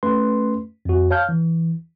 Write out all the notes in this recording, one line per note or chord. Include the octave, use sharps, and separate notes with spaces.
A3 C#4 B4 C6
F2 F#4
C#5 F5 A5 F6 G6
E3